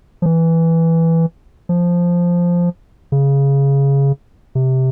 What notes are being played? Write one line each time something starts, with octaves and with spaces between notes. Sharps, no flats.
F3
E3
F3
C#3
C3